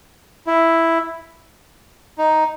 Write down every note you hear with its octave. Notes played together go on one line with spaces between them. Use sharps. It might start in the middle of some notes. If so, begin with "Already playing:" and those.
E4
D#4